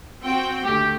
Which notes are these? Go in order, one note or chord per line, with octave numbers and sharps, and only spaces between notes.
C4 F#4 G5
D2 A3 G4